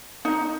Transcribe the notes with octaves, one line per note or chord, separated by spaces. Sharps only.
D#4